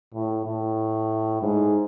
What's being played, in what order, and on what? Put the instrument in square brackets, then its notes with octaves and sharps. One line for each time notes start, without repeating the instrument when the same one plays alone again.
[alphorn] A2
A2
G#2